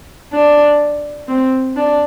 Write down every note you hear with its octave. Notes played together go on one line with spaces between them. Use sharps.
D4
C4
D4